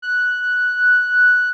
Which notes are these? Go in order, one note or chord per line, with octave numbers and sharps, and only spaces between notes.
F#6